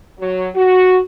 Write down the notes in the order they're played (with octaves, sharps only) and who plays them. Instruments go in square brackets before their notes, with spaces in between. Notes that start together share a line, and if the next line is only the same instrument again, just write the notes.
[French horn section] F#3
F#4